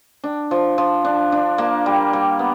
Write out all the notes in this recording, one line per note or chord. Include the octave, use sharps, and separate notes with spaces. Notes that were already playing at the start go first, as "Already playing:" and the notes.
D4
F3
F3
D4
D4
A#3
G3
G3
B3